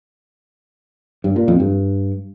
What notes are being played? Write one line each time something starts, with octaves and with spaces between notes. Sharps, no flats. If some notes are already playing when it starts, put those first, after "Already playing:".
G2
A#2
F2
G2